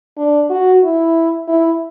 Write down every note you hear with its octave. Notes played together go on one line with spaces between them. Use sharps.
D4
F#4
E4
E4